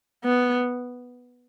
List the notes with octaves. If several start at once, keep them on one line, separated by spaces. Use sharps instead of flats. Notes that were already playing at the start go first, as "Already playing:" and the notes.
B3